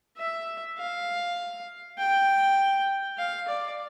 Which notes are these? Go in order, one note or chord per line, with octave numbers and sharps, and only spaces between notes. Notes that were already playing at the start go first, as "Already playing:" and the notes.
E5
F5
G5
F5
D5